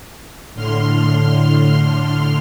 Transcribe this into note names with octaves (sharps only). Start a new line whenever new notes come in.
A2 D3 C6 F6